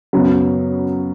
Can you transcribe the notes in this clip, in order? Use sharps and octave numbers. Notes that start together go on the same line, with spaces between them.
F#2 C#3 F#3 B3